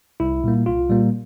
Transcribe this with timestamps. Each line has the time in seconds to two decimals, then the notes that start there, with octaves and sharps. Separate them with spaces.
0.20 C2 E4
0.44 A#2 G3 A#3
0.66 C2 F4
0.90 A#2 G3 A#3